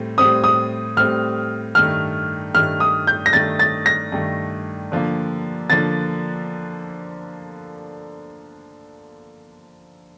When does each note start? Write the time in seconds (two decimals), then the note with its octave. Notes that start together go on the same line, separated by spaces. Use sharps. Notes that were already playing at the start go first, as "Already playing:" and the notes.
Already playing: A2 G3 C4
0.18 A2 G3 C4 D#6
0.44 D#6
0.97 A2 G3 C4 F6
1.75 G2 D#3 A3 F6
2.55 G2 D#3 A3 F6
2.80 D#6
3.07 G6
3.26 A#6
3.33 G2 D#3 A3 A6
3.59 A6
3.86 A#6
4.12 G2 D#3 A3
4.92 D3 F3 A#3
5.70 D3 F3 A#3 A6